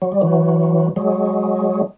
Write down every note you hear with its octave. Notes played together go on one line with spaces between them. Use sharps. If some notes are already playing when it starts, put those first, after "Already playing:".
F#3
G3
E3 F#3
F#3 G#3